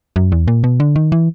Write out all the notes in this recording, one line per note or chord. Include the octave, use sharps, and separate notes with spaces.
F#2
E2
A#2
B2
D3
D#3
E3